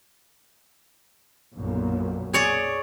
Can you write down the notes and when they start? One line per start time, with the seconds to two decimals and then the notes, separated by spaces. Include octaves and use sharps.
1.55 B1 F#2 A#2
2.33 G#4 C#5 D5